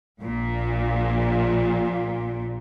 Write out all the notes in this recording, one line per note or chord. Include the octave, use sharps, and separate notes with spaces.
A#1 A#2